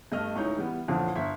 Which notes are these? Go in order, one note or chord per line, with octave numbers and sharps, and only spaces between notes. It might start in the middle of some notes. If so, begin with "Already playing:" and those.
G2 A3 D#5 F6
C#2 A2 D#4 C#5 G6
E3 G3 B3
A1 F2 A#2 D3
G1 E5 B6